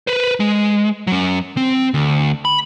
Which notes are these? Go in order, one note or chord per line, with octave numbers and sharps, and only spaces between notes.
B4 C5
G#3
F#3 C#4
C4
D2
B5